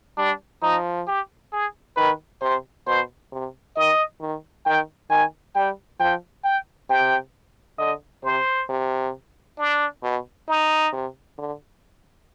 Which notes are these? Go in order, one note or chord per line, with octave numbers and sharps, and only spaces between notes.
G3 D4
F3 D#4
G4
G#4
D#3 B4
C3 C5
B2 C5
C3
D#3 D#5
D#3
D#3 G5
D#3 G#5
G3 G5
F3 G5
G5
C3 G5
D3 D#5
C3 C5
C3
D4
B2
D#4
C3
D3